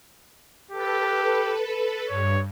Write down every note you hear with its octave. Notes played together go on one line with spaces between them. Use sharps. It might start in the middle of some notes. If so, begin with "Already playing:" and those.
G4 A4 B4
G2 C#5